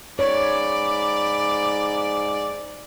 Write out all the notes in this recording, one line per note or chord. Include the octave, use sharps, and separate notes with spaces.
G#2 C#5 D5 B5 D6